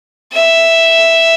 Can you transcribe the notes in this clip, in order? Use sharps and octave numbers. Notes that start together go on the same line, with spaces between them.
E5